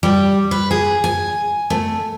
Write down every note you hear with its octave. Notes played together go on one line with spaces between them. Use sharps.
G3
B4
G#4
G#5
A3